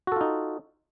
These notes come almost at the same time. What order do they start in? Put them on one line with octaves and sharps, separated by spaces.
F#4 A4 F4 D#4